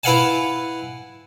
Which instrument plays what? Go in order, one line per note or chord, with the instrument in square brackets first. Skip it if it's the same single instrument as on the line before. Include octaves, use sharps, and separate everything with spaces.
[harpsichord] E4 B4 F5 F#5 G#5 A5